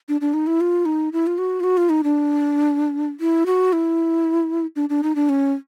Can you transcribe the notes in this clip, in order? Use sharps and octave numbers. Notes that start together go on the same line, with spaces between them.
D4
D4
D#4
E4
F4
D#4
E4
F4
F#4
F4
F#4
F4
D#4
D4
E4
F#4
E4
D4
D4
D#4
D4
C#4